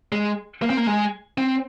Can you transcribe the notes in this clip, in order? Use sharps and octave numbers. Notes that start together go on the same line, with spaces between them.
G#3
A#3
C4
A#3
G#3
C4